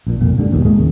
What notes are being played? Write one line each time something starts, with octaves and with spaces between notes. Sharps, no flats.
A#1 A#2
C2 F2 A#2
G#2 D3 G3
E1 A#1 D#2
A2 G#3 A#3
D#2 C#3